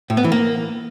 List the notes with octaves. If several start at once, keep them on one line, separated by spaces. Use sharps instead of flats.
A2
B3
E3
A#3